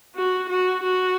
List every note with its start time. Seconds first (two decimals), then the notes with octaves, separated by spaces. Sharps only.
0.16 F#4
0.49 F#4
0.83 F#4